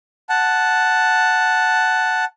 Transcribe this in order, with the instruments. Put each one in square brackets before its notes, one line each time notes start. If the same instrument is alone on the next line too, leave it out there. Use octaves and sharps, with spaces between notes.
[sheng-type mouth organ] F#5 A5